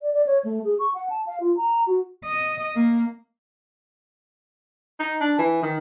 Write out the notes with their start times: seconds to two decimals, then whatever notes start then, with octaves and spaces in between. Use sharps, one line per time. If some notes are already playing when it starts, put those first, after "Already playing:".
0.01 D5
0.13 D5
0.26 C#5
0.44 A3
0.64 G#4
0.79 C#6
0.94 F#5
1.10 A5
1.27 F5
1.40 F4
1.57 A#5
1.87 F#4
2.25 D#5
2.76 A#3
5.00 D#4
5.21 D4
5.39 E3
5.63 D#3